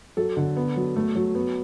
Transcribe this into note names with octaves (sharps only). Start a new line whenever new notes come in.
F#3 A4
D3
B3
F#3
A3
F#3
B3